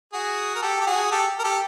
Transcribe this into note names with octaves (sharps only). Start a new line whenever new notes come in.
F#4 G#4
A#4
G4 A4
G4
F#4 G#4
G4 A4
A#4
G4 A4